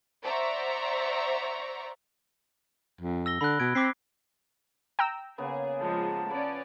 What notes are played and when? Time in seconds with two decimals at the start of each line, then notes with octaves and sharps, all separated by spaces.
0.24 C5 D5 E5 F#5 A#5 C#6
3.01 F2
3.26 E6 A#6 G7
3.41 D3 B5 F#6
3.59 B2 G#6 D7
3.75 C4 D6 B6 C7
4.99 G5 A#5 E6
5.38 C#3 A#3 B3 G#4
5.80 F3 G#3 A5
6.31 C#4 B4 D5